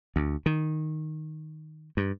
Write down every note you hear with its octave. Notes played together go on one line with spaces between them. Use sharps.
D2
D#3
G2